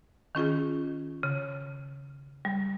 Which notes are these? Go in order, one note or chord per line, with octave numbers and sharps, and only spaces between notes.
D#3 C#4 F4 G#4
C#3
G3